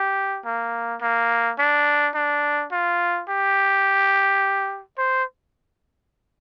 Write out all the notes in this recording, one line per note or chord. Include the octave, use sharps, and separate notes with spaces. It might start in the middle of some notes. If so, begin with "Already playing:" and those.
Already playing: G4
A#3
A#3
D4
D4
F4
G4
C5